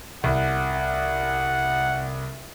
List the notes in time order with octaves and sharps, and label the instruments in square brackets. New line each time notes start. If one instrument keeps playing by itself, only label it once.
[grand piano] C2 [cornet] F#5